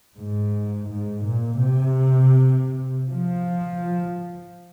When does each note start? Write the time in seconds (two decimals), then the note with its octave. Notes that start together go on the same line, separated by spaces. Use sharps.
0.18 G#2
0.91 G#2
1.27 A#2
1.64 C3
3.09 F3